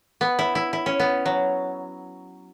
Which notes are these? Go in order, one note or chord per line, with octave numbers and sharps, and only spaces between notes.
B3
E4
E4
E4
C#4
B3
F#3